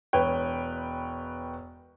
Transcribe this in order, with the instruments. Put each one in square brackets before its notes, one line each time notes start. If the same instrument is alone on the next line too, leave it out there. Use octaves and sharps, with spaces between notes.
[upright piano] E1 B4 C#5 G5